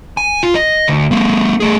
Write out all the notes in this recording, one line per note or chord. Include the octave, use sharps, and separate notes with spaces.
G#5
F4
D#5
D2
G#3 A#3
A3 G#4